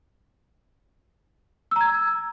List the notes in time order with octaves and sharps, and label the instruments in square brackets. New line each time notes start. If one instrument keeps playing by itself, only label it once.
[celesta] E6
A#5
G#6